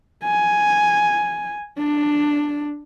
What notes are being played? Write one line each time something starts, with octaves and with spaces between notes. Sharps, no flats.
G#5
D4